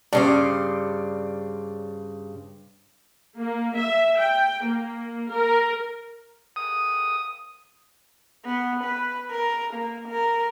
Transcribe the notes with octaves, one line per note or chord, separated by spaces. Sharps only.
G2 C#3 C5 D5
A#3
E5
G5
A#3
A#4
D#6
B3
B4
A#4
A#3
A#4